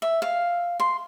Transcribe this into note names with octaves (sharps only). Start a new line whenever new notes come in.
E5
F5
C6